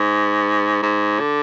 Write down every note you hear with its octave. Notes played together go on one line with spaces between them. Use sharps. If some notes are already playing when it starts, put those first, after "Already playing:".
Already playing: G#2
G#2
D3